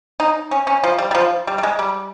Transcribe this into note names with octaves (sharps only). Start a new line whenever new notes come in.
D#4
C#4
C#4
F3
G3
G3
F3
G3
G3
G#3
G3